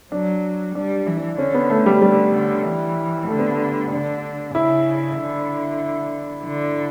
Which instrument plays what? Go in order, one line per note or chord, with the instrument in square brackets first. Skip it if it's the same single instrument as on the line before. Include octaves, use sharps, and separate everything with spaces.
[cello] F#3 [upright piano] D4
[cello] G3 [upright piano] D4
[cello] E3
[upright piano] D4
[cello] D3 [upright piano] C#4
[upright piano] B3
A3
G3
[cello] D3 [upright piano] G3
[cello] D3
E3
[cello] D3 [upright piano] A3
[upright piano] B3
A3
[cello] D3 [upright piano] D4
[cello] C#3 [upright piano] E4
[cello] D3
D3